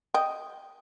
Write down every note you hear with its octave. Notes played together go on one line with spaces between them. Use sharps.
D#5 G5